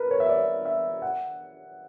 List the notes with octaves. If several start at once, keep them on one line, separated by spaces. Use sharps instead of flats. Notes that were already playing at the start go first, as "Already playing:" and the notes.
Already playing: A#4 B4
C#5
E5
D5
E5
F#5